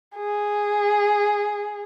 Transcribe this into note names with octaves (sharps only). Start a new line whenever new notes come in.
G#4